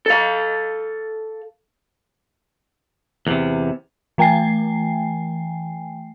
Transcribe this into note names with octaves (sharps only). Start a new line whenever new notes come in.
A4 F5
E2 C3
E3 A3 G5 G#5 C7